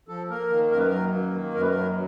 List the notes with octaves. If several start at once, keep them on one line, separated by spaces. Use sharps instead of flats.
F3 A4
A#3 A#4
D#3
F#2 A#4
B4
A#4
F#3
A#3
D#3
F#2 A#4
B4
A#4
F#3